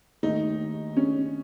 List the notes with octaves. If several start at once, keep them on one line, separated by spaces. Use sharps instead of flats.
D#2 D#3 A3 D#4
C#4